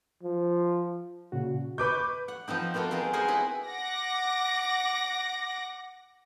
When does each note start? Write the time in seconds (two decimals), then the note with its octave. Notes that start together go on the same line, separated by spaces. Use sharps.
0.23 F3
1.32 A#2 C#3 F#4
1.78 B4 C#6 D6 G6
2.28 F#5
2.48 F3 B3 C4 D#4
2.74 A#3 B3 F4 F#4 A4
2.91 G#3 B3 C4 A#4
3.13 G#4 A#4 C5 F#5 G#5
3.28 E4 G#4 B4 C#5
3.66 F#5 D6 A#6